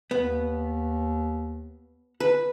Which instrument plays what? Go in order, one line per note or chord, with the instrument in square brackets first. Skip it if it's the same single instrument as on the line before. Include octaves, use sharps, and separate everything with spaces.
[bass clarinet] D#2 [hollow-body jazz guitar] B3
[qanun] B4